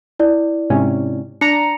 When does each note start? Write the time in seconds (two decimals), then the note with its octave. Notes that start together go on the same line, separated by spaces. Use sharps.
0.19 E4 D5
0.70 G#2 C3 C#4
1.41 D4 A#5 C#7 F7